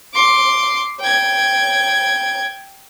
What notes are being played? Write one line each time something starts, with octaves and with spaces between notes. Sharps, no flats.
C6 D6
G5 G#6